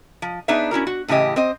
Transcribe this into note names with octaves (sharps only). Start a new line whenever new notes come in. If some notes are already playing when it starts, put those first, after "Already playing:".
F3
B3 D4 D#4 G#4 B4 E5
C#4 E4 F#4 A#4
F#4
A2 C#3 E3 G4 D#5
C4 C5 D#5